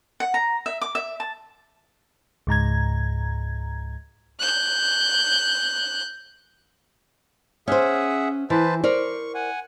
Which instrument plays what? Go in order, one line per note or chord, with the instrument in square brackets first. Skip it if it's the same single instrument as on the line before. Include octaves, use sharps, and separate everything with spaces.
[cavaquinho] F#5
A#5
E5
D6
E5
A5
[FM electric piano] C#2 G#2 A#5 G#6
[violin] F#6 G6
[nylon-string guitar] C#4 C5 [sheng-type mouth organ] G#4 E5 F#5
[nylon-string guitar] E3 [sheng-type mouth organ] B4 C5 A5
[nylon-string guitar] A#4 C5 D5 [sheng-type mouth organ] C#6
[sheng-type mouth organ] F#5 G#5